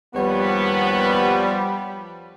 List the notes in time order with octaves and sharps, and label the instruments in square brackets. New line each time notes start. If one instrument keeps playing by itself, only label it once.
[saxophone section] D#2 F#4 C#5 [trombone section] F3 G3 [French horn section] B3